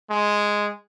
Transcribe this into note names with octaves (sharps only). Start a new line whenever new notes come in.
G#3